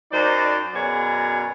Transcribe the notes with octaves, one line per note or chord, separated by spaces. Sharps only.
F#2 D#4 C5 D5
F#2 B2 G#4 C#5 D5